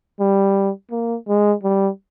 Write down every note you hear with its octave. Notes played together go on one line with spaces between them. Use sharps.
G3
A#3
G#3
G3